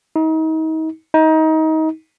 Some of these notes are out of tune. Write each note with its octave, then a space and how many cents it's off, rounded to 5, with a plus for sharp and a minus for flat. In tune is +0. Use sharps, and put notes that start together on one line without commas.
D#4 +35
D#4 +25